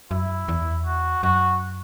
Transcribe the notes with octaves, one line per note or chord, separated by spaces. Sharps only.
F#2 E4
E2
F#4
F#2 F#4